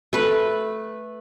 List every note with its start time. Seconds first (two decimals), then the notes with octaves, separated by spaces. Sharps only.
0.13 A3 B4